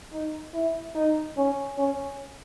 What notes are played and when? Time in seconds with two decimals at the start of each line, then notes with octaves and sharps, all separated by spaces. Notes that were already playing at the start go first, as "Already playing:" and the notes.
0.12 D#4
0.54 E4
0.95 D#4
1.37 C#4
1.78 C#4